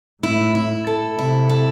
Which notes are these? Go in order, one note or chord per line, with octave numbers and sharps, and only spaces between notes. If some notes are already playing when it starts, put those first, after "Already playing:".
A2 E4
E4
A4
C3 E4
A4